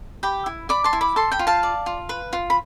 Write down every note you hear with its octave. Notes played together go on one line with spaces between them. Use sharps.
G4 G5 B5
E4
D5 B5 D6
A5 C6
E4
B5 D6
A4 A5 C6
G5 B5
F4
F5 A5
D5
F4
B4
F4
B5